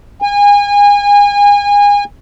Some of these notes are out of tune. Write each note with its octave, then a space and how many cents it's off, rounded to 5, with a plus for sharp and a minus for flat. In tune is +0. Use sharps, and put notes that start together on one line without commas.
G#5 -30